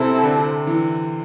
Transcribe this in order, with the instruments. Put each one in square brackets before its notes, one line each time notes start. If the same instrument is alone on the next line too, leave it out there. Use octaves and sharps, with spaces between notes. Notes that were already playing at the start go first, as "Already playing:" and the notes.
Already playing: [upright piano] C3 [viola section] C4 E4 A4
[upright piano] D3
E3